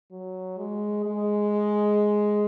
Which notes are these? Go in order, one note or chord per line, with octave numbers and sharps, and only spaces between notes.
F#3
G#3
G#3